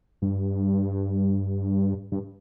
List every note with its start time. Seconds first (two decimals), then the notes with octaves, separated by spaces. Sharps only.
0.22 G2
2.12 G2